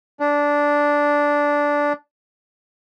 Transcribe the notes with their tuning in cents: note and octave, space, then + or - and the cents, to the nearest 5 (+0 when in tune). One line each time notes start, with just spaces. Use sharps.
D4 -10